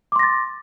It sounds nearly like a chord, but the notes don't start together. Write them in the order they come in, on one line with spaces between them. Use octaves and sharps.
D6 C6 A#6 A6